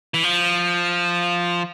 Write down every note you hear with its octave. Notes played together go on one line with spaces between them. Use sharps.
E3
F3